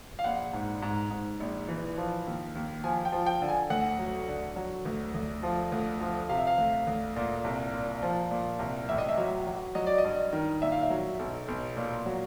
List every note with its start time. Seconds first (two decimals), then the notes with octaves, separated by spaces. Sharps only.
0.19 F5
0.24 A#1 F#5
0.53 G#2
0.82 G#2
1.11 G#2
1.40 A#1
1.68 E3
1.98 F3
2.26 D#2
2.55 D#2
2.84 F3 G#5
3.05 G5
3.12 F3
3.26 G5
3.42 D3
3.48 G#5
3.70 D2 F#5
3.99 F#3
4.28 D3
4.56 F#3
4.85 D2
5.14 D2
5.43 F3
5.72 D2
6.01 F3
6.29 C3 F5
6.38 E5
6.47 F5
6.58 D2
6.87 D2
7.16 A#2
7.44 C2
7.73 A#2
8.03 F3
8.31 A#2
8.59 C2
8.89 A1 E5
8.98 D#5
9.09 E5
9.18 F#3
9.47 F#3
9.75 F#3 D#5
9.86 D5
9.98 D#5
10.04 G2
10.33 D#3
10.62 A#2 E5
10.72 F5
10.82 E5
10.90 F#3
11.19 B1
11.48 B1
11.77 A#2
12.06 F#3